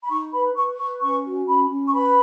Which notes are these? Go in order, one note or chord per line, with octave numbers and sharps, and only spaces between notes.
B5
D#4 C#6
B4 B5
B4 C#6
B4 C#6
C#4 C#6
F#4
C#4 B5
C#4
C#6
B4 B5